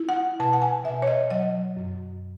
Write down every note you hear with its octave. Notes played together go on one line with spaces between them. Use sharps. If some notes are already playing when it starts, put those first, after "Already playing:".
Already playing: E4
F#5
B2 A5
F#5
G#5
B2 E5
C#5
D#5
F#3 D#5
F#2